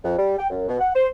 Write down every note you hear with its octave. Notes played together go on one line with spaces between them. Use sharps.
F2
G3
G5
F#2
B2
F#5
C5